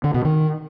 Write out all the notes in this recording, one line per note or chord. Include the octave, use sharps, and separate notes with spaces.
D3
B2
D#3